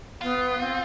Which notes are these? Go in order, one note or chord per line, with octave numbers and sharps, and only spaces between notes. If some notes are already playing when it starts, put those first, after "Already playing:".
B3 F4
C4